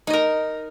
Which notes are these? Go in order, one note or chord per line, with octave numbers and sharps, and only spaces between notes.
D#4 A#4 D#5